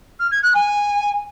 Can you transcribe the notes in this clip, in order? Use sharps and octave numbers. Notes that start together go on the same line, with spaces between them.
F6
G#6
F#6
G#5